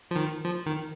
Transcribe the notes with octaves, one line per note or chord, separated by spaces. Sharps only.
F3
D#3
F3
D#3